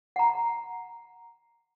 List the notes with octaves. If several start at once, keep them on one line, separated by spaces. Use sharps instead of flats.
F#5 A#5